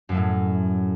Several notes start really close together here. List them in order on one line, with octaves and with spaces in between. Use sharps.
F#2 F#3 A3 A2